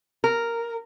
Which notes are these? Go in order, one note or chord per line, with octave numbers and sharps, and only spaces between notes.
A#4